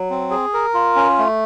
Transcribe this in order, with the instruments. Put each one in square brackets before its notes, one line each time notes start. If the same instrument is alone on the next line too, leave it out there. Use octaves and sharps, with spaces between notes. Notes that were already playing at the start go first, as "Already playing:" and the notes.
Already playing: [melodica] F#3
C4
G#4
A#4
F4
C#4
A3